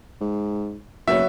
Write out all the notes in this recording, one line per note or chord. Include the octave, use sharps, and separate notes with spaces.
G#2
F#1 F#3 B3 F#4 E5